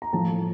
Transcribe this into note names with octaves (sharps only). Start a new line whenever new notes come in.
A#5
A2 F3 A3 A5